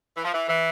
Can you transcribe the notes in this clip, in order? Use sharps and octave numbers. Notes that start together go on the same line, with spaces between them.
E3
F3
E3
E3